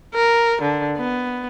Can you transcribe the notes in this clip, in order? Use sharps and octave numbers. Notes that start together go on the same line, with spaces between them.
A#4
D3
B3